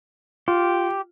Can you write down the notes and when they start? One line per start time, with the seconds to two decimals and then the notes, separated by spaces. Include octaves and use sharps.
0.48 F4 G4